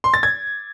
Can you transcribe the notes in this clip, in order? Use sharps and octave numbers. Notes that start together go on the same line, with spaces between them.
C6
A6
G#6